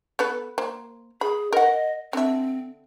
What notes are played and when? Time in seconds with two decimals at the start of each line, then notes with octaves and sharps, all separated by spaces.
0.19 B3 A4 B4
0.58 A#3 C5
1.21 G#4 B5
1.53 A#4 D#5 F#5
2.13 D3 C4 E5